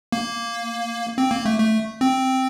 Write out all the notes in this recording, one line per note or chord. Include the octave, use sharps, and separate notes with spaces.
A#3
C4
A#3
A3
A3
C4